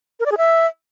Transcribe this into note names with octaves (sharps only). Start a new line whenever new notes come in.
A#4
D5
G#4
E5